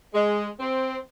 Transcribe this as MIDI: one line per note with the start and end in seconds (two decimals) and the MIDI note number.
0.14 0.48 56
0.59 0.97 60